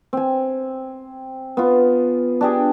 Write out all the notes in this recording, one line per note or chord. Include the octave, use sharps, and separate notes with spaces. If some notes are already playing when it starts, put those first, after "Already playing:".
C4 G#5
B3 F4
D4 G4 G#4